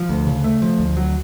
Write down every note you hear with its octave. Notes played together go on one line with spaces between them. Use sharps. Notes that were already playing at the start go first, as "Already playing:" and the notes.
Already playing: F3
D2
C#3
A3
F3
D2
F#3